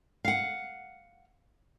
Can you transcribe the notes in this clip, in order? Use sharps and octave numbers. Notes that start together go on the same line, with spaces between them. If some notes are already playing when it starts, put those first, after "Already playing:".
F5 F#5